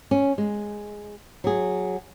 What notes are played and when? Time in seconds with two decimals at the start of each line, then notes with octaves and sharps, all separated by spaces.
0.11 C#4
0.38 G#3
1.44 F#3 G#4